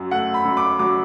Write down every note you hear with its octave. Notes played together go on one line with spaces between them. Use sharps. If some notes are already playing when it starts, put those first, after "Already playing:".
Already playing: F#2 F#3
A3 F#5
B5
F#2
D6
F#3 D6